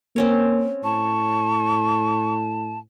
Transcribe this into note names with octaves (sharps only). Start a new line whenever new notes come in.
A#3 C4 C#4 C#5
A2 A5 C#6